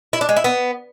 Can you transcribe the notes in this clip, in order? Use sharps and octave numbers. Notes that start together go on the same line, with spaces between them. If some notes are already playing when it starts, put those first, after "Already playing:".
E4
D4
G#3
E4
B3